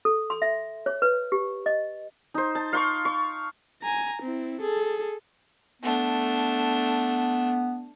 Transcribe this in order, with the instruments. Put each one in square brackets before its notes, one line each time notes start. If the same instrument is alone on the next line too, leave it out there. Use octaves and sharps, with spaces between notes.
[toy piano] A4
C6
E5
C#5
B4
G4
D#5
[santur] D#4 C5
A5
F5 C6 C#6
C#6
[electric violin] G#5 A#5
C4 E4
G#4 A4
[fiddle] A3 D4 [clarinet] B3